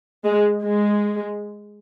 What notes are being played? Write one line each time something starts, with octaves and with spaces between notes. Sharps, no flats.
G#3
G#3